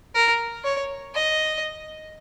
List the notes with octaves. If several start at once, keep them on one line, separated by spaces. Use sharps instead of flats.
A#4
C#5
D#5